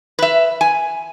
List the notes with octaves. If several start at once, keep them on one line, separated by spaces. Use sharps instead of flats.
B4 E5
G#5